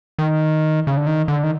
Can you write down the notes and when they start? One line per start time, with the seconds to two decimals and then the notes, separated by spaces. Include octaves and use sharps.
0.19 D#3
0.87 C#3
0.97 D3
1.07 D#3
1.28 D3
1.43 D#3